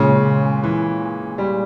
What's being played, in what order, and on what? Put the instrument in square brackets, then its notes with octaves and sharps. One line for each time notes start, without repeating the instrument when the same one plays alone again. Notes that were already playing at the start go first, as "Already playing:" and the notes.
Already playing: [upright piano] A#2 G#3 C#4 [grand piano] C#3
[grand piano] E3
G3